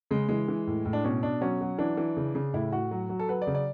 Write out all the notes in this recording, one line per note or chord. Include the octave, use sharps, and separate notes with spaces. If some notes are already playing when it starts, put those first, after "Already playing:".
C#3 G#3
E3 G#3
E3
A2
A2
D4
B2 C#4
B2 D4
F#3 C#4
F#3
E3 D4
E3
C#3
C#3
A2 E4
A2 F#4
F#3
F#3
A4
F#3 B4
D5
C#3
D5